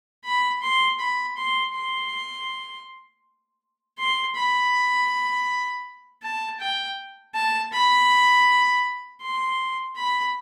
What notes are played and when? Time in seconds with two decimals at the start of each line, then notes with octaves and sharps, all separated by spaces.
0.25 B5
0.62 C6
0.99 B5
1.37 C6
1.74 C6
3.98 C6
4.35 B5
6.23 A5
6.60 G5
7.35 A5
7.73 B5
9.22 C6
9.96 B5